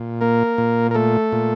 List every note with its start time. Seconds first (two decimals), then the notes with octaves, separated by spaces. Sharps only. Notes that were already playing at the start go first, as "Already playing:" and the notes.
Already playing: A#2
0.21 A#3 A#4
0.58 A#2
0.91 A#4
0.95 A3 A4
1.32 A#2